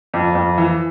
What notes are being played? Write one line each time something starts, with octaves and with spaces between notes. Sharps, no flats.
F2
F2
E3